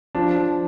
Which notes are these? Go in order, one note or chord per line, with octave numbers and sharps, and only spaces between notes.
F3 D4
F3